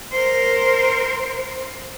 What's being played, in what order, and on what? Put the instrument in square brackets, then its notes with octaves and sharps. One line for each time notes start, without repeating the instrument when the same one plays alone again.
[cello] A#4 C5